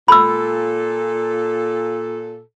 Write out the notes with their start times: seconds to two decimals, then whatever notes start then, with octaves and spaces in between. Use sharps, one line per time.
0.08 A#2 A4 B5 E6